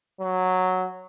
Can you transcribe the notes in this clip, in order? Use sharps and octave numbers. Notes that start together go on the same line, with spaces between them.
F#3